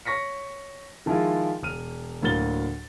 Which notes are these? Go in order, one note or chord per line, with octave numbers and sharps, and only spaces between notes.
C#5 C#6 A#6 B6 C#7
D#3 F3 G#3 E4 F4
E1 F6 D#7
D2 A2 F#3 A#3 A6 G7